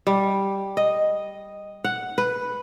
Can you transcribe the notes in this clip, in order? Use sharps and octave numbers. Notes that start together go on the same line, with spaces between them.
G3
D#5
F#5
B4